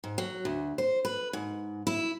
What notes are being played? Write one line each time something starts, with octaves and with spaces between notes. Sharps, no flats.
G#2
F#3
D2
C5
B4
G#2
E4